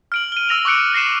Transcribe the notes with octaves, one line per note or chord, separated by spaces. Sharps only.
F6 D7 F#7
D#7 G7
E6 A#6 F7
C#6 D6 F#6 C#7 D7
F#6 A#6 C7 C#7 E7